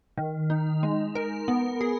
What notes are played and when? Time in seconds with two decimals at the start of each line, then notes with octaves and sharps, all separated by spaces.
0.18 D#3
0.50 D#4
0.83 G#3
1.15 A#4
1.48 B3
1.81 G#4